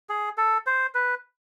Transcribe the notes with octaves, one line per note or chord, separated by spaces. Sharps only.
G#4
A4
C5
B4